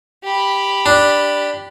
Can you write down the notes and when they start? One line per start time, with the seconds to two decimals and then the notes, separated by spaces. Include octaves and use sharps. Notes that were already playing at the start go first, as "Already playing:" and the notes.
0.23 G4 B5
0.86 D4